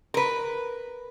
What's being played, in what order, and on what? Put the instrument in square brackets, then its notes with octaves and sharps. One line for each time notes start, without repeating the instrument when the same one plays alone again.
[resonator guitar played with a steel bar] A#4 B4